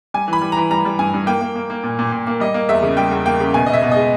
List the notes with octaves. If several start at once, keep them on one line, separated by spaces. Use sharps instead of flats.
G3 G#5
E3
B5
G3
E3 A#5
G3 A#5
G3
G2 G#5
G2
A#3 G5
A#3
A#3
A#3
A#2
A#2
A#2
A#3
G3 D#5
A#3
E2 E5
C#3
G3 G5
E2
A#3 G5
C#3
B2 G#5
B2 D#5
E5
B2
G#3 D#5